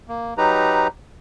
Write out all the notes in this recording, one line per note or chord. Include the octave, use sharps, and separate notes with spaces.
A#3
F#3 D#4 G4 B4 A#5